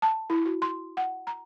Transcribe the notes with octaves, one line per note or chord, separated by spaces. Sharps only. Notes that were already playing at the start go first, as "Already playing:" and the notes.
A5
E4
F#4
C6
F#5
A#5